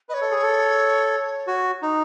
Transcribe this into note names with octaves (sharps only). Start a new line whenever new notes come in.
B4 C#5 D#5
A4
G#4
A4
F#4
D#4